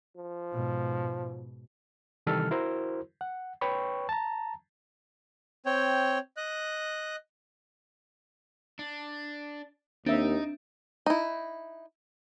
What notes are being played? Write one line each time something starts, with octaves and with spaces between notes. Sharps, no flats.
F3
G#2 B2
C3 D#3 E3 G3 A4 F6
E4 F#4 A#4 C5
F#5
B4 C#5 G5 B5 C#6
A5 A#5
C4 C#5 G5
D#5 F#6
D4
D#2 C4 D4 D#4 E5
D#4 E4